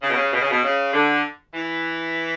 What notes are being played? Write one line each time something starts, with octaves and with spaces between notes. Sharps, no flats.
C#3
B2
C#3
B2
C#3
B2
C#3
D3
E3